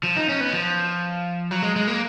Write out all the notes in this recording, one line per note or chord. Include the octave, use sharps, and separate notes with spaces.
F3
D#4
C#4
B3
F3
F#3
G#3
G#3
A#3